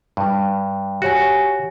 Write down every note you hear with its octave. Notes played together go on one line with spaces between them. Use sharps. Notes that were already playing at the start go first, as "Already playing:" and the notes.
G2
F#4 G4 C#5 G#5